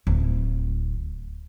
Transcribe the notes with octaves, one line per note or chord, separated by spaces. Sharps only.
D1 A3